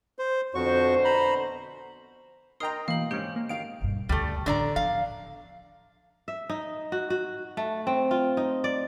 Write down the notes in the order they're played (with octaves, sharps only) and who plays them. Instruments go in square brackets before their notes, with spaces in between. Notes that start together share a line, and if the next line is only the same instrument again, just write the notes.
[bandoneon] C5
[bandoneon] F2 F#4 C#6 [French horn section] B2 D3 C5
[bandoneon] A#5 B5
[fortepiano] A#4 D#5 G5 [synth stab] A#5 C6 [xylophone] D#6
[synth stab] B2 E3 A#3 [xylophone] F5 F#7
[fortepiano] G#2 D#4 [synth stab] C#4 G5 [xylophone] G4
[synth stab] A#3
[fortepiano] D#3 F5 [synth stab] D7
[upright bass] B1 G2
[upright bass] D2 C#3 [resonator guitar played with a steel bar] G3 A3
[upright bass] A1 B3 [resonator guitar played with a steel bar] D3 D5 A#5
[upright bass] F3 [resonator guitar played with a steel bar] F5
[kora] E5
D#4
F#4
F#4
A3
C4
F4
D#4
D5